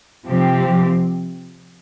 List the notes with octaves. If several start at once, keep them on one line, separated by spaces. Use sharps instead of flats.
C3 F3 C4 G4